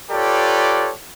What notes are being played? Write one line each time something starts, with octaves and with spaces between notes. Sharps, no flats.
F4 G4 A4 B4 C#5 D5